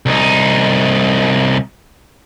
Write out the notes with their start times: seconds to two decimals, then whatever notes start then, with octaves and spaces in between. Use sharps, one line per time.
0.06 C2 D#4